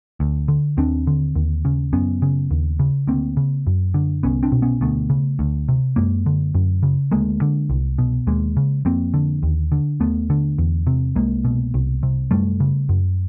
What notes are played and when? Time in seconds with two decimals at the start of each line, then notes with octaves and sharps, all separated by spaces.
0.20 D2
0.48 D3
0.77 D#2 C4 D4
1.07 D3
1.35 D#2
1.65 C#3
1.93 F#2 B3 C#4
2.22 C#3
2.51 D#2
2.79 C#3
3.07 D2 A#3 C4
3.37 C#3
3.67 F#2
3.94 D3
4.23 C2 B3 C#4
4.43 C4 D4
4.52 B2
4.62 B3 C#4
4.81 D2 A3 B3
5.10 C#3
5.39 D2
5.69 C3
5.96 F#2 G#3 A#3
6.26 D3
6.55 F#2
6.83 C#3
7.12 D2 G#3 A#3
7.42 D3
7.70 C2
7.98 B2
8.27 D#2 G#3 A#3
8.57 C#3
8.85 F2 A#3 C4
9.14 D3
9.43 D#2
9.72 D3
10.00 D#2 A3 B3
10.30 D3
10.58 E2
10.87 C3
11.15 C2 G#3 A#3
11.45 B2
11.74 C2
12.03 C3
12.31 F#2 G3 A3
12.60 C#3
12.89 F#2